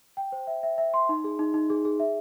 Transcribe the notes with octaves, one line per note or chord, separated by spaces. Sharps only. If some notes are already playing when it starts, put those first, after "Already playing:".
G5
C5
E5
E5
E5
C6
D#4
G#4
D#4
D#4
G#4
G#4
E5